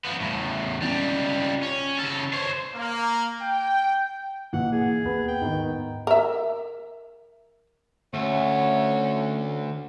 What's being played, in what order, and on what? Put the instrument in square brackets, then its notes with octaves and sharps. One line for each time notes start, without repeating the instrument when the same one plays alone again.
[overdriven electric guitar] F3 B3
E2 A2
C#2 G3
C#4
C#3 A4
C5 C#5
[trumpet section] A#3
G5
[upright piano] B1 E3 [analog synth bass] A#3 [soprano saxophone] F#5
[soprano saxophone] G#4
[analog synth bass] D#2 [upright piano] B3
[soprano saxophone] G5
[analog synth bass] G#2 [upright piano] D#3 B3 D#4
[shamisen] A#4 E5
[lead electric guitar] D2 [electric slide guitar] A3 [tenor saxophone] C#4